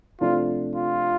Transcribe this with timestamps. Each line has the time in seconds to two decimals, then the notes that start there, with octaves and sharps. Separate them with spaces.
0.20 C3 F3 A3 D4 F4
0.75 F4